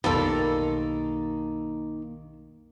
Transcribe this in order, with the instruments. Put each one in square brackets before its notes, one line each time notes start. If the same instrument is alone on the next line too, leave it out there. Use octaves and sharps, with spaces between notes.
[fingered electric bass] B1 F2 B3 [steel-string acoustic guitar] D#3 A#3 [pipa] G3 F4 A4